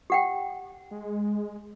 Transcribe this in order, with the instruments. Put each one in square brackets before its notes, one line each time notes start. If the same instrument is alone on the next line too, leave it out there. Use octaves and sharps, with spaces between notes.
[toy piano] G4 F#5 G5
[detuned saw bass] G#3